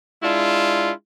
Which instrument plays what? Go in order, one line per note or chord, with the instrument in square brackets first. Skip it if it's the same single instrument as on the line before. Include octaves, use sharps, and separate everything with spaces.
[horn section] G#3 D4 E4 F4